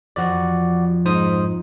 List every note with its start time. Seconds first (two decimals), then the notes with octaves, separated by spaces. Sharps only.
0.16 F2 F3 F#4 D5
1.05 G#2 D#4 C5 D#6